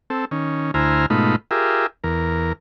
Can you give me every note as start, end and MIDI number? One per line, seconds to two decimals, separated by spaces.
0.10 0.25 60
0.10 0.25 69
0.31 0.71 51
0.31 0.71 61
0.74 1.06 38
0.74 1.06 64
0.74 1.06 72
0.74 1.06 80
0.74 1.06 82
0.74 1.06 89
1.10 1.36 44
1.10 1.36 47
1.10 1.36 57
1.10 1.36 63
1.10 1.36 65
1.10 1.36 83
1.51 1.86 65
1.51 1.86 67
1.51 1.86 68
1.51 1.86 70
1.51 1.86 76
2.04 2.53 40
2.04 2.53 70